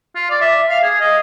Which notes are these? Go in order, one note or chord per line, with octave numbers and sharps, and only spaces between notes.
F4
D5
E5
F5
G#4
D#5